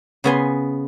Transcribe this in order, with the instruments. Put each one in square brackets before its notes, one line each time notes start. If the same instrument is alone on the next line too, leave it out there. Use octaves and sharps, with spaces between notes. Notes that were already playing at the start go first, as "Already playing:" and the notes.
[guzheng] C#3 B3 G#5 C6